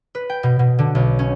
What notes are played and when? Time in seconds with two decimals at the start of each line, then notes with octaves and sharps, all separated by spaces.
0.15 B4
0.30 G5
0.43 B2
0.59 B2
0.79 D3
0.95 B1
1.19 C#4